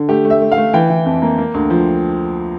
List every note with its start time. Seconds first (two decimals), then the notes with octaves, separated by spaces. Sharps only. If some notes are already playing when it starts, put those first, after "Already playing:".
Already playing: D3
0.08 A3 G4
0.25 A3
0.30 E5
0.42 A3
0.52 F5
0.58 A3
0.73 E3 G5
0.90 E3
1.06 F2
1.22 A#3
1.38 A#3
1.54 D2
1.70 F3